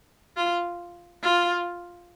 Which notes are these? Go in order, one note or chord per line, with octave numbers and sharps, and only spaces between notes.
F4
F4